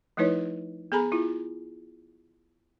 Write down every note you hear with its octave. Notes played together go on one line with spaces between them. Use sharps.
F3 A3 D#4 E4 B4 C#5
B3 G#4 A4 G#5 A#5 B5
E4 F4